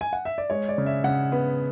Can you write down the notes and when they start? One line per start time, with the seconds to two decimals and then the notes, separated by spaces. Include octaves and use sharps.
0.01 G#5
0.13 F#5
0.25 E5
0.38 D5
0.50 G#3 C#5
0.69 D5
0.78 C#3
0.86 E5
1.04 C#3 F#5
1.32 B3